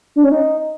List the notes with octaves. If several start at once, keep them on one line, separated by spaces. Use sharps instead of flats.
D4
C#4
D#4